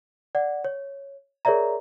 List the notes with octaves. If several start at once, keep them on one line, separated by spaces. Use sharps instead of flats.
D5 F#5
C#5
G#4 A#4 C#5 D5 E5 A#5